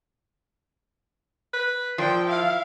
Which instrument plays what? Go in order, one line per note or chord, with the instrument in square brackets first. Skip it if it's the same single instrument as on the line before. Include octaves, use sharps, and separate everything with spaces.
[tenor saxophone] B4
[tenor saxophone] A#2 [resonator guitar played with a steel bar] F3 [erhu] G5
[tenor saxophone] E4 [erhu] F5